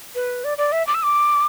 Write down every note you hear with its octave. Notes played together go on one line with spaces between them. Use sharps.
B4
D5
D5
E5
D6
E6
D6